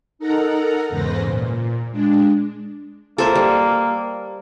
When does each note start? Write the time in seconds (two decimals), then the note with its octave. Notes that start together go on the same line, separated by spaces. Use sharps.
0.19 D#4 A4 A#4 F#5 A#5
0.89 E2 G#2 C#3 B4 C5 A#6
1.23 A#2
1.92 G#3 D4
3.18 A#3 A4 C5 E5
3.35 G3